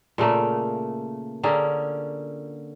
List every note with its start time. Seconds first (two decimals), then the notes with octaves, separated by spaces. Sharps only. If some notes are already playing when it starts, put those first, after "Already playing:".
0.18 A#2 C#3 A3 A#3
1.43 D3 A#3 C#4 G#4